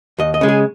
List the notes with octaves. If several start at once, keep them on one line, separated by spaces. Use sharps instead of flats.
D#2 D#5
D#5
C#3 G#3
G#4